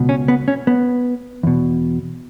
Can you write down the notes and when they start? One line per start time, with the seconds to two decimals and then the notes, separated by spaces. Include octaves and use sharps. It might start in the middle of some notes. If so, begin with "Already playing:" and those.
Already playing: C#2 B2
0.09 C#4
0.28 B3
0.48 C#4
0.67 B3
1.43 E2 B2